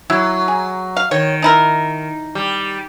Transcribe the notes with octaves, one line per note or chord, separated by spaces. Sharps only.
F#3 E4
G#4
F5
D#3 C#5
D#4 E4 A#4
G3